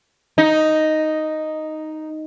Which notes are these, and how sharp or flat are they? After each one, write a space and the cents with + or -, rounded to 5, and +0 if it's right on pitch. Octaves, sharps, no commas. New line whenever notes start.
D#4 +0